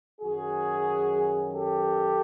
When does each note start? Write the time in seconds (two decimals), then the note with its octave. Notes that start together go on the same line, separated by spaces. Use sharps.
0.21 F#2 D#3 F#3 F#4 G#4
1.52 G4 A4